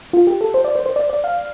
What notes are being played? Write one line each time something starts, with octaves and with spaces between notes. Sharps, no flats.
F4
G4
A4
C5
D5
C5
C5
D5
D5
F5